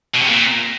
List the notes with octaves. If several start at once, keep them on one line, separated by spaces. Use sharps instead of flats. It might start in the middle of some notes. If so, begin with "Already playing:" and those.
B2
C3
A#2